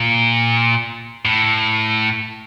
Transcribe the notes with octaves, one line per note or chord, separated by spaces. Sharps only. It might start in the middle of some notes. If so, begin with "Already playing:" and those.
Already playing: A#2
A2